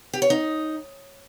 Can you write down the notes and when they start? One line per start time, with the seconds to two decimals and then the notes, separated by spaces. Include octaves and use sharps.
0.13 G4
0.22 C#5
0.30 D#4